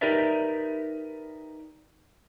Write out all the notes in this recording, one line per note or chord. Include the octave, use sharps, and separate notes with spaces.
D#4 G4 A#4 B4 D5 E5